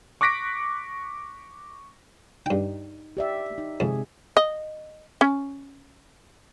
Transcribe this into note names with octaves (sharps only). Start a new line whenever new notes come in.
C#6 D6 F#6 A#6 B6 D7
G2 D#4 G5
G4 D5 E5
D#4
F2 C3 G#3 G#4
D#5
C#4